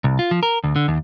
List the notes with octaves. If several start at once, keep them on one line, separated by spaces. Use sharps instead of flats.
C2
F4
F3
A#4
D2
D3
D#2